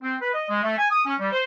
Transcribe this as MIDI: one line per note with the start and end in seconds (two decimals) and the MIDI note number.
0.03 0.15 60
0.21 0.31 71
0.33 0.47 75
0.49 0.61 56
0.63 0.78 57
0.78 0.87 80
0.91 1.05 87
1.06 1.14 61
1.20 1.31 55
1.32 1.43 72